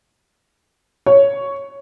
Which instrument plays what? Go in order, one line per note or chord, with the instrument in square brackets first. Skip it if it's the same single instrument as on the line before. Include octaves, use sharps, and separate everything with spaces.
[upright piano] C#5